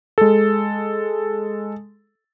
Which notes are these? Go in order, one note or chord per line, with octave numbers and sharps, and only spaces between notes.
G#3 A4